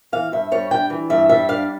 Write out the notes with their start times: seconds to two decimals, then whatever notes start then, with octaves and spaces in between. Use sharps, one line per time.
0.12 E3 F5
0.32 G2 E5
0.51 G3 C#5
0.71 D4 G5
0.90 E3
1.10 G2 E5
1.29 G3 E5
1.49 D4 F5